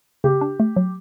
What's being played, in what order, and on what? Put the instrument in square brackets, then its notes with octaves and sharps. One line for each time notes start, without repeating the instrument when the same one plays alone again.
[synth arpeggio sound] C#3 [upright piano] G4
[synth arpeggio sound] D4
A3
F#3